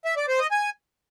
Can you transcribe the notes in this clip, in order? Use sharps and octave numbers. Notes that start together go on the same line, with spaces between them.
E5
D5
C5
D#5
G#5